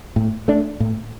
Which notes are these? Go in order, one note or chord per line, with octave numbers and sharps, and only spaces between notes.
A2
A3 D4
A2